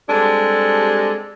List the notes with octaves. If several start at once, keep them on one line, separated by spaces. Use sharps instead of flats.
G3 G#3 C4 D4 G4 A4